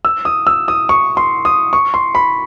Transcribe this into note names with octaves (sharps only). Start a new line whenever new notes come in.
E6
D#6
E6
D#6
C#6
C6
D#6
C#6
C6
B5